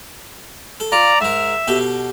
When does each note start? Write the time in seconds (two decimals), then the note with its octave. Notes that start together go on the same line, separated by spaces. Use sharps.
0.80 A4
0.92 F4 D5 A#5
1.21 G#2 A#4 E5
1.67 B2 G4 A4